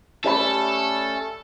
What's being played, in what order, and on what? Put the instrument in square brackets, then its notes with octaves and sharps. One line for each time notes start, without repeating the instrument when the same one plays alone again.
[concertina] A3 C#4 [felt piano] G4 D5 B5 [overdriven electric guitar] A4